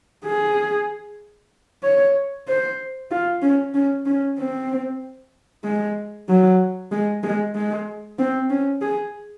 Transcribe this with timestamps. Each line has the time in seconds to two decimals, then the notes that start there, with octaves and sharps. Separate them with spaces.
0.25 G#4
1.83 C#5
2.48 C5
3.11 F4
3.42 C#4
3.74 C#4
4.06 C#4
4.38 C4
5.64 G#3
6.29 F#3
6.92 G#3
7.23 G#3
7.55 G#3
8.19 C4
8.50 C#4
8.82 G#4